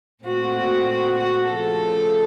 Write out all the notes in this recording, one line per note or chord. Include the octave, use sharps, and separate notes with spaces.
A#2 A3 C4 F#4
F#4
F#4
F#4
C#3 F3 A3 A4